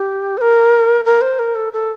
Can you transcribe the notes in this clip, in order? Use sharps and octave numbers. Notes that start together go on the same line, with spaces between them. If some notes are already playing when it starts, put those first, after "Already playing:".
Already playing: G4
C5
A#4
A#4
C5
A#4
A4
A4